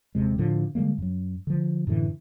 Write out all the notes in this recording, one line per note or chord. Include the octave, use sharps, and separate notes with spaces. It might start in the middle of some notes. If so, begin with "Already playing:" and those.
D#1 D#2 C3 G#3
A2 D3 F3
D3 G3 G#3 A#3
F#2 F#3
D3 F3
F#2 A2 D3 E3